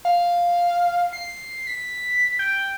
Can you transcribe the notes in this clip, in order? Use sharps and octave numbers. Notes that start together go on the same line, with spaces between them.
F5
C7
B6
G5